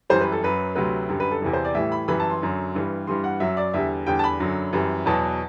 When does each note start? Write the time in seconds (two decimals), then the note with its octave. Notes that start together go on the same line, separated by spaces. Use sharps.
0.10 F#2 E3 G3 C5
0.21 B4
0.32 A4
0.43 F#2 F#3 B4
0.75 D2 C3 F#3 B4
1.09 F#2 D3 G3
1.20 B4
1.31 A4
1.42 E2 C3 E3
1.53 C5
1.65 D5
1.74 A2 E3 G3 E5
1.92 B5
2.08 F#2 E3 G3 B5
2.20 A5
2.30 C6
2.41 F#2 D3 F#3
2.75 G2 E3 G3
3.07 G2 E3 G3 C6
3.24 F#5
3.40 F#2 F#3 E5
3.57 D5
3.74 E2 D3 G3 E5
4.07 E2 D3 G3 G5
4.19 A5
4.24 B5
4.40 F#2 D3 F#3
4.73 F#2 E3 G3
5.06 E2 B2 F#3 A5